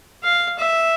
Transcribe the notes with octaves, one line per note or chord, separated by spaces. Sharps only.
F5
E5